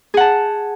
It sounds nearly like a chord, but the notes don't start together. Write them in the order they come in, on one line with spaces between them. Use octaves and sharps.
G#4 F#5 A5